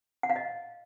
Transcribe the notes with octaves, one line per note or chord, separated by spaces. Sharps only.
F#5
F5
D#5